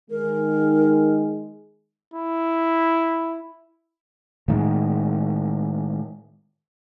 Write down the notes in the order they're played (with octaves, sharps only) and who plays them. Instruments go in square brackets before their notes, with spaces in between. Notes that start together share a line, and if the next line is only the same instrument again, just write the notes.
[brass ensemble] D#3 G#3 [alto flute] A#4
[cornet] E4
[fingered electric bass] A2 D#3 G#3